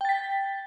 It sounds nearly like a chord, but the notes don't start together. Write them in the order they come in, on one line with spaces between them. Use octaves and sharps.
G5 A6 B6